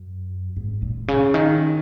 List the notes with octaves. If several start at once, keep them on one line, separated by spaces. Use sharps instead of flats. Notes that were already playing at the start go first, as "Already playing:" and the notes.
Already playing: F#2
G#2
A#2
C#3
D#3